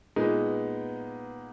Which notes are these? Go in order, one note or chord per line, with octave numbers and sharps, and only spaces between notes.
A#2 G#3 B3 D#4